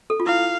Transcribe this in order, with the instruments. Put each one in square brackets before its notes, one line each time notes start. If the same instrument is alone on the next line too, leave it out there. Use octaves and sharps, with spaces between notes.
[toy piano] A4
F4
[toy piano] E4 [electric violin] F5